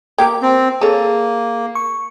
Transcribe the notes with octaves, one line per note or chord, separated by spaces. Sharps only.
A#3 G4 A#4 G5
C4
A#3 G#4 A4 C#5
C#6